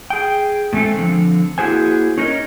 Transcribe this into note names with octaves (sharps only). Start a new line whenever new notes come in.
G#4 G5
A2 G#3 A3 C4
D3 F3 C4
A#3 E4 F#4 G#4 C5 G#5
C#4 D#4 A#4 C#5 D#5